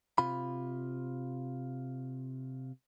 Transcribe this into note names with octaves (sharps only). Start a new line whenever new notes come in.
C3 F4 B5